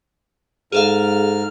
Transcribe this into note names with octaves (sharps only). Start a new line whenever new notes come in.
G#2 G#4 A4 F5 F6